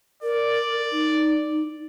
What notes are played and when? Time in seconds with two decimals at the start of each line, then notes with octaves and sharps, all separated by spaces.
0.23 A#4 D5
0.92 D#4